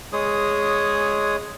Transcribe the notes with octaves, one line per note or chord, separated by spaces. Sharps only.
G#3 G#4 C#5 D#6